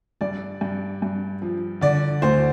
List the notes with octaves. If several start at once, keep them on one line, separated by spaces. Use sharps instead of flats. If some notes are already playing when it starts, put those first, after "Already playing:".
G2 D5
G2
G2
F3
D3 D5
D2 C5